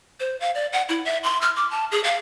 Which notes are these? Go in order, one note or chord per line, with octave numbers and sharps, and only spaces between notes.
C5
F5
D5
F#5
E4
E5
C6
F6
D6
A5
G#4
F5